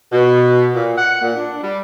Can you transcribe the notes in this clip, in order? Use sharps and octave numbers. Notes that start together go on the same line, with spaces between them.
B2
A#2
F#5
A#2
D4
G3